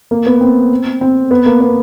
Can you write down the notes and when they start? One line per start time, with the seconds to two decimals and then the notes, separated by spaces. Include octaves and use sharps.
0.11 A#3
0.26 B3
0.41 C4
1.01 C4
1.31 B3
1.46 A#3
1.61 B3